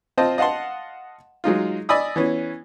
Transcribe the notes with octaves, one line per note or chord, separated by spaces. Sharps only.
C4 F4 C5 D#5 A5
D#5 F5 F#5 A5 C6
F#3 G#3 D#4 F4
D5 D#5 G#5 B5 D#6 E6
E3 B3 C#4